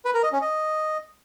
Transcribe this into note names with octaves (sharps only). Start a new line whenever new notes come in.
B4
A#4
D#5
C#4
D#5